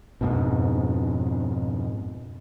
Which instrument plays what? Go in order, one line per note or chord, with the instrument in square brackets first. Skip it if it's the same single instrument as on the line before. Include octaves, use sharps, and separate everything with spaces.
[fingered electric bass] F2 G#2 B2